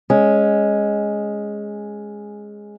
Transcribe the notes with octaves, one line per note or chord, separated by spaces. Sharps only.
G#3 C#4